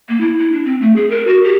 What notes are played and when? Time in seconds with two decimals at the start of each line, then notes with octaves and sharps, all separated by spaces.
0.09 A#3
0.21 E4
0.39 E4
0.52 D4
0.65 C4
0.81 A3
0.96 G#4
1.10 A#4
1.27 F#4
1.44 G4